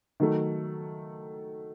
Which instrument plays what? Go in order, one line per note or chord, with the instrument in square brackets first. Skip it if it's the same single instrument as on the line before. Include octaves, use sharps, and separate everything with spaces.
[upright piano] D#3 F#3 A3